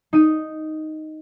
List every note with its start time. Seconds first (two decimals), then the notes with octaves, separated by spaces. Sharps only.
0.13 D#4 D#7